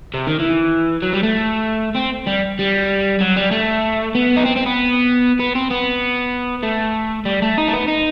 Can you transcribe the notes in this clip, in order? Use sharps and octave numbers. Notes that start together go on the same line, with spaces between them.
C3
D#3
E3
F#3
G3
A3
C4
G3
G3
F#3
G3
A3
B3
D#4
C4
C4
B3
B3
C4
B3
A3
G3
A3
D#4
A3
B3
D#4